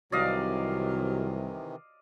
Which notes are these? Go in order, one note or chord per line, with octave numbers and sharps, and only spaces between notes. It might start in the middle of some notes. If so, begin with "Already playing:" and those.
C2 C3 D#3 E3 F#3 D5 D#5 F5